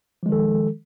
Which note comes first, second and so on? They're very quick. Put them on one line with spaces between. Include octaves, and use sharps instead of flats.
F3 G#3 D#3 A4